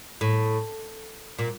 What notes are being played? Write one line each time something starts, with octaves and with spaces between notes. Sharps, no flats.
A2
A#2